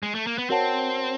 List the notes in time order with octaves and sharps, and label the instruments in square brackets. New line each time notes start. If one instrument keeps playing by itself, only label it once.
[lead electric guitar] G#3
A3
A#3
B3
[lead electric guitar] C4 [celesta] F#4 A#4 C#5 F#5 A5